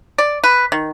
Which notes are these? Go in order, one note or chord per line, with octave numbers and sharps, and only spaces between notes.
D5
B4
D#3